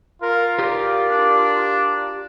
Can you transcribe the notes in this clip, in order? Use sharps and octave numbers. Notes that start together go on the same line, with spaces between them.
F4 A#4
G4 A#4 D5
D4